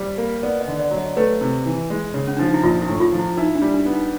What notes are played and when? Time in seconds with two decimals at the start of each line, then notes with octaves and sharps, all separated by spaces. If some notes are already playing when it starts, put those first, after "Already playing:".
Already playing: G3 C5
0.18 A#3
0.43 B3 D5
0.61 D#5
0.68 D3
0.79 D5
0.91 F#3
0.98 D#5
1.17 A3 B4
1.41 C3
1.66 E3
1.90 G#3
2.14 C#3
2.27 C#4
2.37 F3 D4
2.45 D#4
2.54 E4
2.63 A#1 F4
2.82 E4
2.88 A2
3.00 F4
3.12 F3
3.19 E4
3.37 D#4 E4
3.55 D4
3.62 G3
3.74 D4
3.86 B3
3.93 D#4